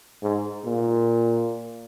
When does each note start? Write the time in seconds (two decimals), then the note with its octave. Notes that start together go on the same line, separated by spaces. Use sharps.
0.23 G#2
0.65 A#2